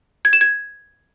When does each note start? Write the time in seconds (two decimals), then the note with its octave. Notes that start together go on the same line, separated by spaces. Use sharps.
0.25 G#6
0.33 E7
0.41 G#6